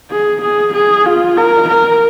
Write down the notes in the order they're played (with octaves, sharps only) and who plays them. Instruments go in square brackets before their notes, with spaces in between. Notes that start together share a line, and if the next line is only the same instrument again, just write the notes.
[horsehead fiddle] G#4
G#4
G#4
F4
A#4
A#4